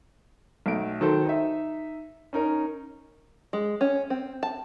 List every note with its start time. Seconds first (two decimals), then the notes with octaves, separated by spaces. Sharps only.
0.66 B1 A3 D7
1.01 D#3 F#3 A4 C5
1.26 D#4 E5
2.33 C#4 D#4 A#4
3.53 G#3
3.81 C#4
4.10 C4
4.43 A5